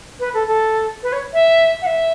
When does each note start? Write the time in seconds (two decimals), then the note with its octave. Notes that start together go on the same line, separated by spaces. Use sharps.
0.20 B4
0.34 A4
0.47 A4
1.03 B4
1.12 C#5
1.34 E5
1.82 F#5
1.86 E5